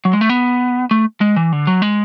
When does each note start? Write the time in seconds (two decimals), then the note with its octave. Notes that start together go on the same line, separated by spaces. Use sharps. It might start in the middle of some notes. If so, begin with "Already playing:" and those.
0.05 F#3
0.13 G#3
0.21 A3
0.29 B3
0.91 A3
1.21 G#3
1.36 E3
1.52 D3
1.67 F#3
1.82 G#3